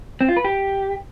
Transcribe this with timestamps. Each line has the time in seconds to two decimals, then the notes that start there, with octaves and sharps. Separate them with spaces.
0.21 C4
0.29 F4
0.37 B4
0.45 G4